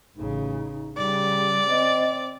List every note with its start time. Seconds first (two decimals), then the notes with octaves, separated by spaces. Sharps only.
0.17 A1 C#3 D#4
0.97 C#3 G3 D5
1.70 C4 D#5